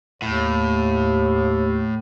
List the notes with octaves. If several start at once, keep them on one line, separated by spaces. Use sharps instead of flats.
D#2 A2